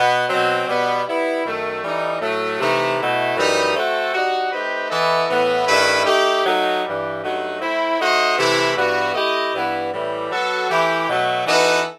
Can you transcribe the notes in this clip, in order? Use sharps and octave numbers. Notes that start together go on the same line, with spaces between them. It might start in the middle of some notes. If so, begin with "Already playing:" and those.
Already playing: B2 B3
B2 F#3 C4
B2 G3 B3
G3 B3 E4
F#2 D#3 A3
E3 G3 D#4 A4
A2 F#3 A3
C3 E3 A3 D#4
B2 A3 E4
F#2 E3 G3 D#4
A3 C4 F#4 A4
G3 D#4 F#4
A3 C4 D#4 G4 B4
E3 B3 E4 A4 D#5
A2 E3 B3
G2 D#3 A3 E4 B4
A3 D#4 G4
F#3 A3 D#4
G2 E3 G3
G2 F#3 A3 D#4 F#4
A3 C4 E4
A3 D#4 F#4 C5 D#5
C3 E3 A3 E4
G2 E3 B3 F#4
A3 E4 G4 D#5
G2 E3 B3 E4
A2 E3 G3
F#3 B3 F#4 A4
E3 A3 E4 G4
B2 F#3 A3
E3 B3 D#4 F#4 A4